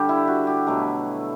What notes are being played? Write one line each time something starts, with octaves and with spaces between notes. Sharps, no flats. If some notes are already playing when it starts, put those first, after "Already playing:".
Already playing: D3 G3 G4
E4
F#4
G4
B2 F#3 A3